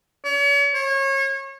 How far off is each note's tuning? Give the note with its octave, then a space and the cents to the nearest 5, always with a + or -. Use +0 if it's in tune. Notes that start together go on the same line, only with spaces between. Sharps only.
C#5 +40
C#5 -30